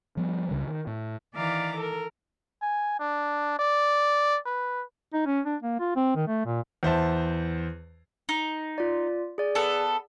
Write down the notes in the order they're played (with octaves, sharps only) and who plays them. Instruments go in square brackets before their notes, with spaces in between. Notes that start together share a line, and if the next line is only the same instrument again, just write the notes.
[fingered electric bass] F3 G3 B3
C#2 C#3 G3
D#3
A2
[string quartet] D#3 E3 D5 F5 A#5 D6
A4 A#4
[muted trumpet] G#5
D4
D5
B4
[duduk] D#4
C#4
D4
A#3
F4
C4
D#3
A3
A#2
[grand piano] E2 C5 E5 A5
[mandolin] D#4
[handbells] F4 D5
G#4 D5
[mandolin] B3 A4